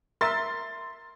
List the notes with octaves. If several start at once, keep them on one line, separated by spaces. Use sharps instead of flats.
A#4 E5 C6 A6